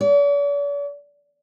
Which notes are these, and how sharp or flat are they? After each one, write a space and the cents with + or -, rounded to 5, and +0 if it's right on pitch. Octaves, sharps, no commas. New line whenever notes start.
D5 -45